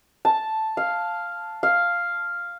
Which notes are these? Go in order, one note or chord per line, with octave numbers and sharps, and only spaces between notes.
A5
F5
F5